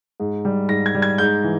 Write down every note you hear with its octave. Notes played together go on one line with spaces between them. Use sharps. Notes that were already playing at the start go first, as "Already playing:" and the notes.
G#2
G3
G#2 A#6
G#6
G3
G#6
G#2 G6
E3